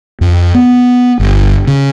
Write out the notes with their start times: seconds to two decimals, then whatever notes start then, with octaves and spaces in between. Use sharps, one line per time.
0.21 F2
0.54 B3
1.20 G1
1.67 C#3